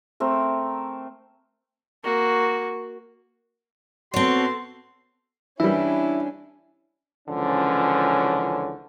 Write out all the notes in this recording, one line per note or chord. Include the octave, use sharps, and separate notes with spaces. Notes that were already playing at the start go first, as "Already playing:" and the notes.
A3 C4 A#4
A#3 F#4
B3 C4 F#4 A4 C#5 A5 C6
E3 G3 C#4 D4 E4 E5
C#2 D3 E3 F3 C#4